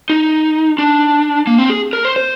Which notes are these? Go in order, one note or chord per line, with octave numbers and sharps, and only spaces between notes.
D#4
D4
A#3
C4
G#4
A#4
C5
C5